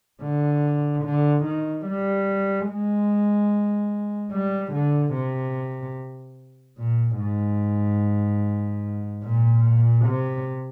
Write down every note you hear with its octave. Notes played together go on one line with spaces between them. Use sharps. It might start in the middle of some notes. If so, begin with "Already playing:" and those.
D3
D3
D#3
G3
G#3
G3
D3
C3
A#2
G#2
A#2
C3